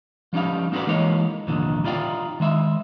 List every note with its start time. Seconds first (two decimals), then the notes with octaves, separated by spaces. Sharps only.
0.33 F3 G3 C#4 D#4 F5
0.72 C4 D#4 F#4 A#4 B4 D5
0.87 E3 G#3 A#3 D#4 C#5
1.47 C2 F2 A#2 D3 D#3
1.84 D#4 F4 D5 F5 G5
2.40 D#3 G#3 E5